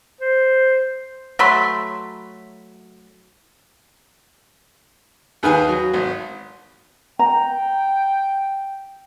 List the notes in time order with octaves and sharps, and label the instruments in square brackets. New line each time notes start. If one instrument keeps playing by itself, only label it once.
[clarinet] C5
[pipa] F#3 A3 B5 C6
[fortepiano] D#2 D#3 G#4 B4 F5 G#5
F#3
G#1
[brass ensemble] G5 [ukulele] A#5